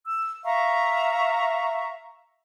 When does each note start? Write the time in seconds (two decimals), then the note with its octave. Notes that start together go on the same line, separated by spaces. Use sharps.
0.05 E6
0.44 E5 F5 A#5 C#6